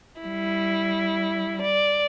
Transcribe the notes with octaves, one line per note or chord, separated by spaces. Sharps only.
G3 E4
D5